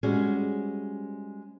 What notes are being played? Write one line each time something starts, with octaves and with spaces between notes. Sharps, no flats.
G3 G#3 C4 C#4 F#4 G#4